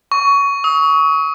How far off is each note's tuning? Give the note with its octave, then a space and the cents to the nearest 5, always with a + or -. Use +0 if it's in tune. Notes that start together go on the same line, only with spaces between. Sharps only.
C#6 +20
D#6 +45